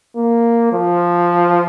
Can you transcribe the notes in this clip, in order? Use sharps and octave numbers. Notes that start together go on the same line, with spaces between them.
A#3
F3